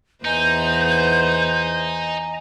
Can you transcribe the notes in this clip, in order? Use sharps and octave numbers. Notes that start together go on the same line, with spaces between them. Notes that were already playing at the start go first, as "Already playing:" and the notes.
E2 D#4 B4 C5 D#5 G#5 A#5 G6